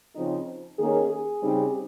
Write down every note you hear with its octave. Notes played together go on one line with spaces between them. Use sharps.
C#3 F3 C4 D#4
D#3 A#3 C#4 G#4
G#4
C#3 G3 C4 D#4